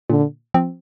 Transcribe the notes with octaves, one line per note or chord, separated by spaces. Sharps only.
A#2 D3
F3 C4